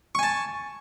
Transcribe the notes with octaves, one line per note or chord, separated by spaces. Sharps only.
G#5 A5 C#6